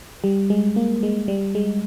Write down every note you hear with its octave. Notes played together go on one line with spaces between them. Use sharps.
G3
G#3
A#3
G#3
G3
G#3